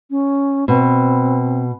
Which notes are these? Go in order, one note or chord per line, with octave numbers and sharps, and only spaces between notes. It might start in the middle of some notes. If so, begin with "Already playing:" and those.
C#4
B2 C4